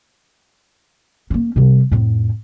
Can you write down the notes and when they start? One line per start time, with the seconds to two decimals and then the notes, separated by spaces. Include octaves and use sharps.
1.30 A#3 C#4
1.56 C3 G3
1.92 F2 A2